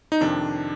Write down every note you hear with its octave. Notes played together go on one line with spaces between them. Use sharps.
D#4
F2 C3 D#3 D4